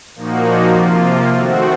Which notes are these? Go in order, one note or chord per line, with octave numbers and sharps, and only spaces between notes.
A#2 F3 A#3 D#4 F#4
C3 F3 A#3 F4
D#3 A3 C4 F#4